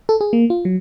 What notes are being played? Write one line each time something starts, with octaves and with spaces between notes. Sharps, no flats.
A4
G#4
A#3
F4
F#3